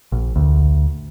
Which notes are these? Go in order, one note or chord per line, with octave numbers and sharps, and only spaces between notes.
A#1
D2